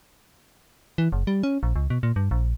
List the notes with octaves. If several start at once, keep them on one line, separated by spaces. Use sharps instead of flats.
E3
F#1
G3
C#4
A#1
C#2
B2
A#2
G2
A#1